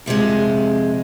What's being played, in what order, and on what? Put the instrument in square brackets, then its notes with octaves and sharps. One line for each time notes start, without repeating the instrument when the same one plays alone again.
[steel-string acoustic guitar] F2 C3 F3 G#3